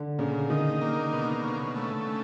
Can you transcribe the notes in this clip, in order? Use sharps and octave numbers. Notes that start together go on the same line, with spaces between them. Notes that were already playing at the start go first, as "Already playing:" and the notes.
Already playing: D3
A#2 C#3
D#3 D#4
A#3
B2
C#3
A3
C#3